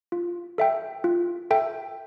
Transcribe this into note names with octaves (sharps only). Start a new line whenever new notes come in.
F4
A4 E5 G5
F4
A4 E5 G5